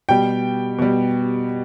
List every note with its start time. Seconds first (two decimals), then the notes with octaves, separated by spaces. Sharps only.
0.09 B2 G3 G5
0.79 B2 G3